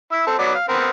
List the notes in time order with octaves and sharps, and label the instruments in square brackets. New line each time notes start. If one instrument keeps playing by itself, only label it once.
[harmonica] E4 E6
C4 A4
F#3 B3 D5
F5
B3 C4 A#4